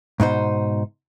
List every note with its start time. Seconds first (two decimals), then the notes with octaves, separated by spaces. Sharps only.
0.20 G#2 B2 D#4 C5